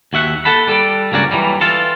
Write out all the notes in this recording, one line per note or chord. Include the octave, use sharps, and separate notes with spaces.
D#2 F#4 E5 F#5
A4 F#5 A5 B5
G3 A4 D5
C#2 G2 A#3 C#4 F#4 D5
E3 F#3 G3
E3 F4 A4